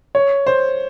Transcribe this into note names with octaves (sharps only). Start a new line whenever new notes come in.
C#5
C5